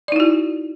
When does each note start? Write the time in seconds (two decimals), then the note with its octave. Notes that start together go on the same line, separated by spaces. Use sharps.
0.08 D5
0.12 D#4
0.16 E4
0.20 F#4